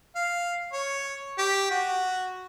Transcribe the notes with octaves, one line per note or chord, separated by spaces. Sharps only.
F5
C#5
G4
F#4